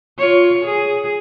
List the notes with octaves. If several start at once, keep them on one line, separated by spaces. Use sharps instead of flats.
F4 C#5
G#4